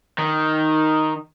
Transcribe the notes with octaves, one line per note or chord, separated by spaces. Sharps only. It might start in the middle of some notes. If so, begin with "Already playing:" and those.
D#3